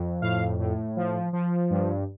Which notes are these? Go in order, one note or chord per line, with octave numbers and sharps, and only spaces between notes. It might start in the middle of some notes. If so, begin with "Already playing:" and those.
Already playing: F2
A2 F5
A2
F3
F3
G2